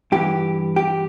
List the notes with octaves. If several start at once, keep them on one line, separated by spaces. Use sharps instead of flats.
G2 E3 G4
G4